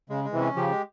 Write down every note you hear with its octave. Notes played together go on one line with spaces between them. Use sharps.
C#3 G#3
G#3
C3 E3
C#4
C#3 F3 G4
G#3